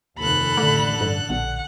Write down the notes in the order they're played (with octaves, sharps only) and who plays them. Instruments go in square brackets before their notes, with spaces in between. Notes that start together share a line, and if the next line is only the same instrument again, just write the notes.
[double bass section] F1 D#2 [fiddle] A4 F#6 [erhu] B5
[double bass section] A1 D3 [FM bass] A3
[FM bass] G2
[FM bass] A#1 [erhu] F#5